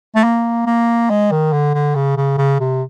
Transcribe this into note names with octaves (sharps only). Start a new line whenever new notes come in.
A3
A#3
A#3
G#3
D#3
D3
D3
C#3
C#3
C#3
C3